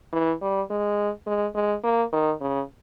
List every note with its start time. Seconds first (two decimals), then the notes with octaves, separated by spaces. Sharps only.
0.13 E3
0.42 G3
0.70 G#3
1.27 G#3
1.55 G#3
1.83 A#3
2.13 D#3
2.41 C#3